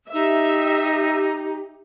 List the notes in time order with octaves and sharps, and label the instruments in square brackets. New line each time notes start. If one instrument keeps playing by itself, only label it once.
[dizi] D#4 [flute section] G4 [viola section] E5